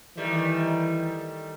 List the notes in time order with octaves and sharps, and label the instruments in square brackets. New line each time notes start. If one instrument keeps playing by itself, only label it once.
[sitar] D#3 G3 A3 [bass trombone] E3